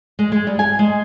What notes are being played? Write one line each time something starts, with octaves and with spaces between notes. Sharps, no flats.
G#3
G#3
G3
G#5
G#3